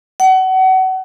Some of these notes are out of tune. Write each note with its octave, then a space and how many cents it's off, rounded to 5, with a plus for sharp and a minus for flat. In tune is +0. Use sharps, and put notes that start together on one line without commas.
F#5 +30